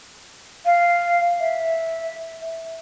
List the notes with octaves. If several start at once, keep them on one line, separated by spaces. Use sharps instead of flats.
F5
E5